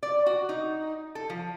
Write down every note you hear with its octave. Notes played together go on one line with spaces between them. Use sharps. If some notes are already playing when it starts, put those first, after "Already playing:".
D5
F#4
D#4
A4
F3